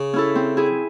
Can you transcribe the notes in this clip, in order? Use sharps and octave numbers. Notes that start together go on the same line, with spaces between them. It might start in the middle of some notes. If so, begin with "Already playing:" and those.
Already playing: C#3
C#4 E4 A4
C4
E4 G#4